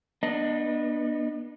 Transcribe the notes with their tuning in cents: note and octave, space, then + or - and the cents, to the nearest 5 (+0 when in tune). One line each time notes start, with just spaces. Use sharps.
B3 -30 D4 +25 D#5 +0